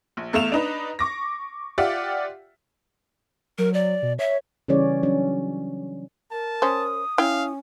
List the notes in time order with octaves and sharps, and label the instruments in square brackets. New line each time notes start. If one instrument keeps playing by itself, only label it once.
[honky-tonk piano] A#1
E2 A3 F5 E7 F7
D4 D#4 B4
C#6 D6 A#6
F4 G4 D5 E5 F#5
[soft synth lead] F#3 [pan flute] A#4
[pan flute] D5
[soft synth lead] B2
[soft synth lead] C#5 [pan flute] E5
[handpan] C#3 E3 G3 C#4 C#5 D5
F#3 C#4 D4
[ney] A#4 [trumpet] A5
[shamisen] C#4 C5 [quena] D#6
[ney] C#4 [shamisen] E4 G5 [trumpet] F5